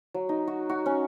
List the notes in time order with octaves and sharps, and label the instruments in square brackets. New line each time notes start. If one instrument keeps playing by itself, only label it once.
[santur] F#3
D#4
F#4
F#4
C#4